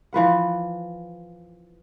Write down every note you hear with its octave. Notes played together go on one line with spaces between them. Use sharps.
E3 F3 B4 F#5